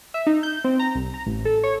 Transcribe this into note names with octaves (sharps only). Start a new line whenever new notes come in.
E5
D#4
G6
C4
A#5
C2
A#5
A1
A4
C#5